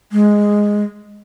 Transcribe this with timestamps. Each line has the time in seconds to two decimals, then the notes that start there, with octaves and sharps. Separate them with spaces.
0.12 G#3